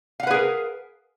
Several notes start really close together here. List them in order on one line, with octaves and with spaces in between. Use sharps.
F5 F#5 B4 G#4 A#4